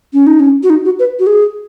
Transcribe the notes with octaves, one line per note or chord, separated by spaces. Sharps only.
C#4
D#4
C#4
F#4
D#4
F#4
B4
F#4
G#4